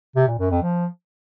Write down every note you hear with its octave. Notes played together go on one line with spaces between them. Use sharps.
C3
A#2
F#2
F2
F3